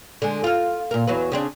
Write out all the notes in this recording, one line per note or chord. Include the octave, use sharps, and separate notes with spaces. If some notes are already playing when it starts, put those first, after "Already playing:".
D3 G#3
F4 F5
A#2 A#4
E2 F#3 B4
C#3 C4 D4